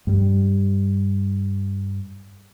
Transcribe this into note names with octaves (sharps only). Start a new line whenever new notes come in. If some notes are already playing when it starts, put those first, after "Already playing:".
G2 G3